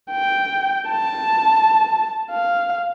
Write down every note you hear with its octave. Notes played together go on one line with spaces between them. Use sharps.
G5
A5
F5